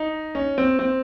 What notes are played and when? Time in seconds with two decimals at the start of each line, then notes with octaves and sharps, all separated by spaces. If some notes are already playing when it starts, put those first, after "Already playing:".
Already playing: D#4
0.35 C#4
0.58 C4
0.79 C4